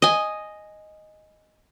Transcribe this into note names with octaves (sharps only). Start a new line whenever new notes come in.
D#5 G#5